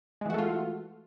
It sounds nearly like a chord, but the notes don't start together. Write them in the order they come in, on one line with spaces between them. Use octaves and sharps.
G#3 E3 F#4 A3 F4